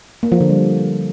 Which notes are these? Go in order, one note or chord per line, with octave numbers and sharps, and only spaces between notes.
A#3
F3
D3
G3